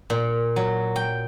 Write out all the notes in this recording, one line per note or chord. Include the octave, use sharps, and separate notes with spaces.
A#2
F#3
G5